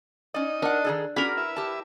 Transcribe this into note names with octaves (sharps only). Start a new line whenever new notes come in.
C#4 D#4 D5 D#5
D4 A#4 F#5
D#3 G#4 A4
C#4 D4 F#4 G#4 A#4 B5
E4 B4 E5
G4 A5